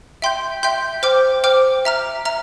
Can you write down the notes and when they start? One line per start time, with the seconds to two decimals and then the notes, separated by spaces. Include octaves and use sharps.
0.22 E5 G5 C6 G6
0.63 E5 G5 C6 G6
1.03 C5 G5 D6 F6
1.44 C5 G5 D6 F6
1.85 E5 A#5 F6
2.25 E5 A#5 F6